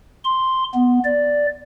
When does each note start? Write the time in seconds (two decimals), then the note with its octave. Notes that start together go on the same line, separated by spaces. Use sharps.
0.25 C6
0.74 B3
1.04 D5